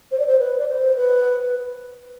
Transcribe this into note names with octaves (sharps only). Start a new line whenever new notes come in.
C5
D5
C5
B4
D5
C5
B4